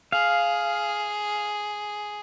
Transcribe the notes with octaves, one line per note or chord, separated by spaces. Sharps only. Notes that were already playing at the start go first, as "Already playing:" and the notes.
G#4 F5